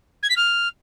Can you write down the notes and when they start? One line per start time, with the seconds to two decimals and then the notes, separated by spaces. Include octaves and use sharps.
0.23 G#6
0.30 B6
0.36 F6